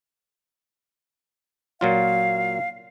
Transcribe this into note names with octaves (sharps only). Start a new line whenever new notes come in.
A#2 F#3 F4 F5